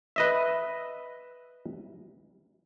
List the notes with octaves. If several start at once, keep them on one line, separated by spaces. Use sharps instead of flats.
B4 D#5 E5